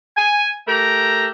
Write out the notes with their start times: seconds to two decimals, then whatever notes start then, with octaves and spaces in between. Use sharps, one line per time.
0.17 G#5
0.68 A3 G4 A#4 A#5